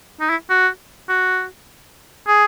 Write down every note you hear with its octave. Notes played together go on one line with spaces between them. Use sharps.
D#4
E4
F#4
F#4
G#4